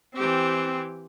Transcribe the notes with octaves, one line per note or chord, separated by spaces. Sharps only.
E3 C4 G4